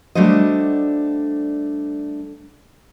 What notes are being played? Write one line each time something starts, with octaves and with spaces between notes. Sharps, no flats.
G3 A3 D4 F#4 C5 D#5